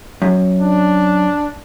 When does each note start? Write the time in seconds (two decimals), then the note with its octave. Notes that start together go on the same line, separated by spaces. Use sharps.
0.22 F#2
0.60 D4